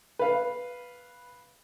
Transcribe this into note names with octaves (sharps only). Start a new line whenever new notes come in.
B4 F5